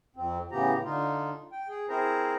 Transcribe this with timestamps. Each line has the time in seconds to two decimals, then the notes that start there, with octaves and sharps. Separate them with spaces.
0.16 F2 C4
0.52 A2 C#3 E3 B3 G4 A#5
0.84 D3 D#4 F4
1.52 G5
1.68 G#4
1.89 C4 E4 G#4 A#4 C5 A#5